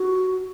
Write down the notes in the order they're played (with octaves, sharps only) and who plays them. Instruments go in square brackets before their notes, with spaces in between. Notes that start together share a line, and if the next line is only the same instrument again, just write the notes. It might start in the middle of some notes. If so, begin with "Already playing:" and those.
Already playing: [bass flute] F#4